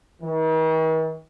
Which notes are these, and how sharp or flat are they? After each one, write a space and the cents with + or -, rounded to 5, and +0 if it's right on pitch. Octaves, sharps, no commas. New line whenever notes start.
D#3 +45